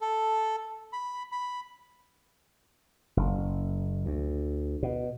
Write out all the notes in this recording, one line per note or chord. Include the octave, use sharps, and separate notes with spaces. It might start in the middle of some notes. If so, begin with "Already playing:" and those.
A4
B5
B5
F#1
D2
B2